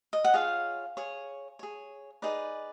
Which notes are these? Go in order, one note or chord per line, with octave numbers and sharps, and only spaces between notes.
D#5
F#5
F4 G#4 C#5 F5
G#4 C#5
G#4 C#5
D#4 G#4 B4 D5